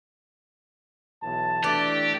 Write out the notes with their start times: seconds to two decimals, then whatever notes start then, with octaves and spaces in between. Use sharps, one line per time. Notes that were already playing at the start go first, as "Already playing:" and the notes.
1.23 B1 B2 E3 A5
1.64 E3 A3 D4 G4 D5